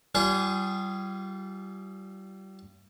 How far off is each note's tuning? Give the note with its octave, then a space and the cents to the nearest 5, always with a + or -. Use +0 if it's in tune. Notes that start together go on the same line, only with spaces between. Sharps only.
G3 -30 F4 -30 G#4 +0